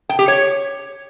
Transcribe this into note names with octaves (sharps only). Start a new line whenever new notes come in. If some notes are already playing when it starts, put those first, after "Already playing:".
G5
G4
C#5